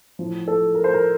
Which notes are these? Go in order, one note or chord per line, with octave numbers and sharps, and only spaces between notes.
A2 F3
A4
A#4
C5
A#4